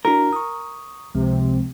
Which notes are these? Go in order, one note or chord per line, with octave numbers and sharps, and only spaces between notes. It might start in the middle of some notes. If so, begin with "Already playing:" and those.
D4 E4 F#4 A#4
C#6 D#6
C#2 C3 F3 G#3